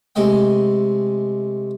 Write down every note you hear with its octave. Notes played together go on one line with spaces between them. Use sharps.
C3 G#3 A3 D#5 G5